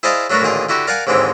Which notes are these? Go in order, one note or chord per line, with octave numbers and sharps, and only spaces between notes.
E4 G#4 C5 D5 D#5 F5
F#3 A3 D4 F#4 A#4 B4
A1 A#2 D3 D#3 D#4 G#4
D3 E4 F#4 G4
A#4 D5 F5 F#5 G#5
D#2 G#2 D3 E3 G#3 C4